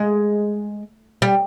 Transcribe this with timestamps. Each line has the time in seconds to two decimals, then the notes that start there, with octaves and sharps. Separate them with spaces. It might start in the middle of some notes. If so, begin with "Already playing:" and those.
Already playing: G#3
1.22 G3